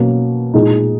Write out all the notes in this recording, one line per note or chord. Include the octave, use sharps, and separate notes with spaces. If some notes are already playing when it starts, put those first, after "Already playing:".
Already playing: B2 F#3 A#3 C#4
A#2 G#3 D#4